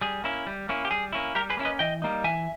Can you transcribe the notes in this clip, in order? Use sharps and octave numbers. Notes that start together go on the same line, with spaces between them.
G3 G#4
A#3 C#4 E4
G3
A#3 C#4 E4
G4
G3 G#4
A#3 C#4 E4
G3 G4 A#4
G#4 B4
A#3 C#4 E4
B4 D#5
E3 D#5 G5
G3 A#3 D#4
E3 E5 G#5